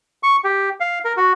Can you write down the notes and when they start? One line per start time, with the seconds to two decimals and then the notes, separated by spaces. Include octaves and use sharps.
0.23 C#6
0.44 G4
0.80 F5
1.05 A#4
1.17 F#4